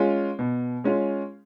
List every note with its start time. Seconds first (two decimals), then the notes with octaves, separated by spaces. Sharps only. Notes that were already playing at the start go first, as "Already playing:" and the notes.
Already playing: G#3 C#4 F4
0.39 B2
0.84 G#3 C#4 F4